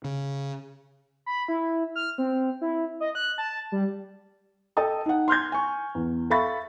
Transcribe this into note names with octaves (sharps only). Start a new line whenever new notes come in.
C#3
B5
E4
F6
C4
E4
D#5
F#6
A5
G3
A4 D#5 G5 A5 D#6
D#4 F#5
C6 F6 G6 G#6
G#5 C#6
E2
A4 E5 F5 B5 C#6 A6